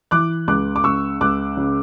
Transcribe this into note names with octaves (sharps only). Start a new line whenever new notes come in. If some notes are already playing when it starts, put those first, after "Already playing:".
E3 D6 F#6
C#2 D6 F#6
D6
C#2 C#6 E6
C#2 D6 F#6
C#3